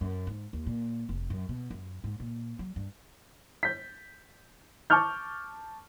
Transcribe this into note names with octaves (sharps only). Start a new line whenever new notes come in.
F#2
G#2
D#2
A#2
F1
F#2
B2
F#2
G#2
A#2
F#3
G2
G6 B6
A5 C#6 D6 F6 G6